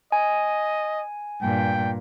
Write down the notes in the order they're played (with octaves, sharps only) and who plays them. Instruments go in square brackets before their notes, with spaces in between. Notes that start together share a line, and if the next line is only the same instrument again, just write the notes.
[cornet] D#5 [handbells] G#5
[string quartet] G2 A#2 [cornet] G5